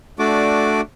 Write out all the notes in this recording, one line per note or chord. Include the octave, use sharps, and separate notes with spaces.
A3 D4 F#4 D5 D6